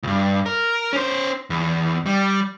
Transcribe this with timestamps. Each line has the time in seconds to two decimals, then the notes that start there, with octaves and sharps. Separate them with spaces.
0.03 C#2 G2
0.46 A#4
0.93 C#4 C5
1.50 E2
2.06 G3